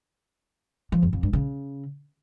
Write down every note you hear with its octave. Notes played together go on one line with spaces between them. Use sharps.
F3
F2
F2
G2
C#3